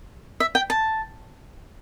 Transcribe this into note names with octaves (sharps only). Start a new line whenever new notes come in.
E5
G5
A5